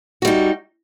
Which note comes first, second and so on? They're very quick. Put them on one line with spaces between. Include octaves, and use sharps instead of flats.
F#4 G3 D#4